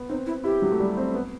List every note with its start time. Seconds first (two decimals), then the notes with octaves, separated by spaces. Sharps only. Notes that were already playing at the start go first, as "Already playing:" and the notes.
Already playing: B3
0.09 C4 D#4
0.26 E4
0.44 E4 G4
0.62 F#3
0.72 A3
0.80 G3
0.97 C4
1.14 B3